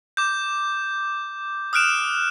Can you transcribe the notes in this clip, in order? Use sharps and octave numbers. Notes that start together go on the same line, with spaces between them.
D6 G6
D#6 F6 F#6 D7 E7